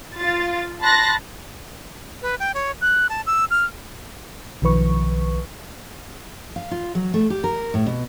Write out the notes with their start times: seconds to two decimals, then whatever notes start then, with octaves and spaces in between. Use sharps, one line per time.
0.16 F4 A6
0.81 A5 B5 C6 F#6 A6 A#6
2.22 B4
2.40 G5
2.54 C#5
2.81 F#6
3.09 A5
3.27 E6
3.51 F6
4.62 B1 D#3 F3 B4 C#6
6.56 F5
6.71 F4
6.95 F#3
7.14 A3
7.30 G4
7.44 A#4
7.74 A2
7.86 B2